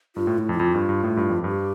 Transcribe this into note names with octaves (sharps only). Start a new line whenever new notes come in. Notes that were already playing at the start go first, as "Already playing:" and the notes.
G2 F4
A2
A2 E4
F2
E4
F2 F4
G2
G2
A2
G2
F2
G2 G4